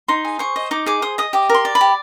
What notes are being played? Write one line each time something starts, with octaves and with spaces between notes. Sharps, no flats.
D#4 C6
G#4
C5 C#6
D#5
D#4 D6
G#4 D6
C5 D#6
D#5 D#6
G4 D6
A#4 C6
D5
B5
G4